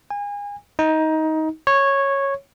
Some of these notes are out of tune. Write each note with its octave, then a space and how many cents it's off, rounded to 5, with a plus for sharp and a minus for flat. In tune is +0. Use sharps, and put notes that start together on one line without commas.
G#5 -30
D#4 +20
C#5 -10